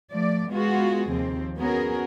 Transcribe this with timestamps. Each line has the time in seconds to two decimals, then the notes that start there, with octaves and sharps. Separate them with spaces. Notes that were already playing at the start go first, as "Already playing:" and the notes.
0.12 F3 A3 D5
0.49 G#3 B3 F4 F#4 G#4
1.09 D#2 C3 F3 C4
1.58 B3 C#4 F#4 G#4 A#4